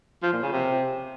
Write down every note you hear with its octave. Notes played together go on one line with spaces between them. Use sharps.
F3
A#2
C#3
C3